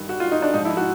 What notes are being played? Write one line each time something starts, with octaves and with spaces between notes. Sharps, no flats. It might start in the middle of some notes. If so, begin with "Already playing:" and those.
Already playing: G2 D#3 G3
F#4
F4
D#4
D4
G#2 D#4
F3
E4
F#4